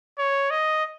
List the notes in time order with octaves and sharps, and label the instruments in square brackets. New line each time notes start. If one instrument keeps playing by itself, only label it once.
[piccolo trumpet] C#5
D#5